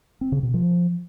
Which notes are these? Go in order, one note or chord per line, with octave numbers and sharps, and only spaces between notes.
C4
C#3
B2
F3